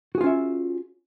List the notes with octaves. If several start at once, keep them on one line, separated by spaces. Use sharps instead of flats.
C#4 F4 F#4 G#4 E5